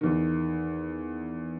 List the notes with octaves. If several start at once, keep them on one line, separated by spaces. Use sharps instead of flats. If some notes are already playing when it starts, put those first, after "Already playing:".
E2 D#3